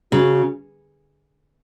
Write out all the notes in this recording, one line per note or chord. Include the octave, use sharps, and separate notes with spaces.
C#3 F#4